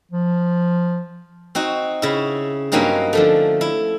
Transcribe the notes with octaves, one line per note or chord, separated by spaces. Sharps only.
F3
C4 D#4 F#4
C#3 E4
G2 F#3 A#3 C4 C#4 D#4
D3 F3 A3
E4